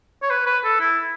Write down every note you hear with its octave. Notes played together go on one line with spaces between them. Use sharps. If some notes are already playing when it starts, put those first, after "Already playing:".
C#5
B4
B4
A4
E4